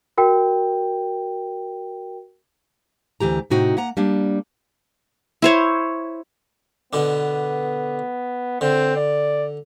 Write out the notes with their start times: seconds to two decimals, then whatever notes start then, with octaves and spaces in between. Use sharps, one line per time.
0.18 F#4 A#4 G5
3.20 D2 E3 G4 A#5
3.50 A2 C3 D#4 F#4 G5
3.77 A#3 F#5 A#5
3.97 G3 A#3 D4
5.42 E4 C5 C#5
6.93 B2 D3 B3 D4
8.61 D3 C4
8.96 D5